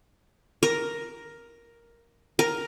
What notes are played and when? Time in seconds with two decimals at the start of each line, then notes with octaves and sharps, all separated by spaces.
0.63 A#4
2.39 A#4